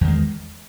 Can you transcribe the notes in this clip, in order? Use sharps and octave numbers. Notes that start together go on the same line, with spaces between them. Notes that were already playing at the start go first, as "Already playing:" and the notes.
E2 D#3 G#3